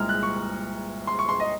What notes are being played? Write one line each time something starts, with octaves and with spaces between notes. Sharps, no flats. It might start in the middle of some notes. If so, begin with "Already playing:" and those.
Already playing: C2 A#2 G#3 A#5 F6
F#6
C#6
C6
C#6
C6
D#5